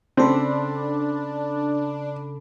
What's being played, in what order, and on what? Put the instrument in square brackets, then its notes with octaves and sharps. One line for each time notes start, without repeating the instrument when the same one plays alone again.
[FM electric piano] C#3 A4 B5 [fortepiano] C4 [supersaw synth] D4